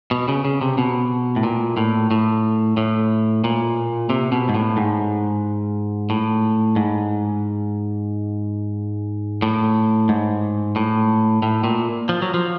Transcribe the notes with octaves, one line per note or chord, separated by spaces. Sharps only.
B2
C#3
C#3
C3
B2
A2
A#2
A2
A2
A2
A#2
C3
B2
G#2
A2
G#2
A2
G#2
A2
G#2
A2
A2
A#2
F3
F#3
F3